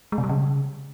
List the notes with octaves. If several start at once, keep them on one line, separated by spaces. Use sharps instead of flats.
G#3
C3
G3
C#3